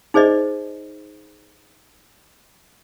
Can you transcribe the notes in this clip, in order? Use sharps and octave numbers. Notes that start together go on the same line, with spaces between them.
D#4 G#4 C5 D5 D#5